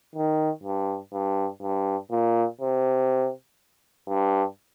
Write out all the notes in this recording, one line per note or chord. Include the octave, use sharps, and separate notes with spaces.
D#3
G2
G2
G2
A#2
C3
G2